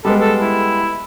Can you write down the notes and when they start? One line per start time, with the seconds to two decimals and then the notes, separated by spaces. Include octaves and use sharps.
0.05 G3 G#3 B3 A4
0.20 A4
0.41 E4